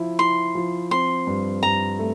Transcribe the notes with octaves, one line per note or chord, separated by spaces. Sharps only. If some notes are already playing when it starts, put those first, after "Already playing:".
Already playing: F3 E4
E4 C6
F3
C4 C6
G2
G2 A#5
A3